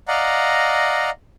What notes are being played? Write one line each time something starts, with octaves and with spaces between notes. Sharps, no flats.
D5 D#5 F5 F#5 A#5